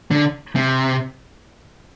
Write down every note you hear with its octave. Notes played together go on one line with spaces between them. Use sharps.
D3
C3